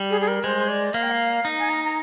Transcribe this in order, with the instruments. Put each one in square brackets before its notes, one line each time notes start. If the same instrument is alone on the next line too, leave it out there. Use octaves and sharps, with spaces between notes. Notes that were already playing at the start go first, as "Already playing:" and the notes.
Already playing: [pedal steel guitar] G3
[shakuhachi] G#4
G#4
A#4
[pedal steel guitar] G#3 [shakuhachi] C5
[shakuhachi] D5
[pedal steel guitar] A#3 [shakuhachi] F5
[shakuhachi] G5
F5
[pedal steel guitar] D#4
[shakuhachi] G#5
A#5
A#5